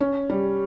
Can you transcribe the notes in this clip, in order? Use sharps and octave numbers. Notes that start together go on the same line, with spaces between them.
C#4
G3